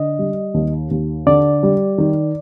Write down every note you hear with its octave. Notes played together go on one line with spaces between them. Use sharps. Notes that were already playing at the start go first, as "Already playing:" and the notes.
Already playing: D3 D#5
G3
D#2
D#2
D3 D5
G3
D#3